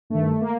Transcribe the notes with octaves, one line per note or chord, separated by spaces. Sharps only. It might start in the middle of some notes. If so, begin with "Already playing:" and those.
G2 D#3 A3
A#3